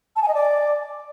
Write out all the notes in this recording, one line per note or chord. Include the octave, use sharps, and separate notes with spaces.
A5
G#5
D#5
D5